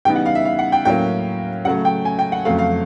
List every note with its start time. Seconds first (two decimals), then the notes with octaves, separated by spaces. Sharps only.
0.05 C#3 E3 G3 B3 D#4 G5
0.16 F#5
0.26 F5
0.35 E5
0.45 F5
0.59 F#5
0.72 G5
0.85 A2 F#3 A#3 C#4 G5
1.65 C#3 F#3 A3 F#5
1.85 G5
2.05 G#5
2.19 G5
2.32 F#5
2.45 F2 C#3 F#3 A3 F5
2.59 F5